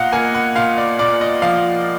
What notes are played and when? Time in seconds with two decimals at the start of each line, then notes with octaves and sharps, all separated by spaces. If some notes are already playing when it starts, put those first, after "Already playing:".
Already playing: A#2 D#5 F5 F#5
0.13 A#3 G#5
0.34 F#5
0.55 A#2 F5
0.78 D5
0.99 A#2 D5
1.21 D#5
1.42 F3 F5